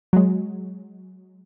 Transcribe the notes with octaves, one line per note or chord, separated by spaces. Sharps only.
F#3 G#3